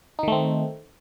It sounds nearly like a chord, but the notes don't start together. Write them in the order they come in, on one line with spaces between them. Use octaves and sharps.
D#4 D#3 A3 C4